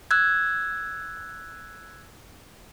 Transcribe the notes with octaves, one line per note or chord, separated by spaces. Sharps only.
E6 F#6 G#6